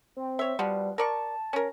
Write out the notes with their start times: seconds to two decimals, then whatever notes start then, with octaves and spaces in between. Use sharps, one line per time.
0.16 C4
0.39 C#5 E5
0.59 F3 G3 B3 F#4
0.98 A#4 D5 A5 C#6
1.53 C#4 A#4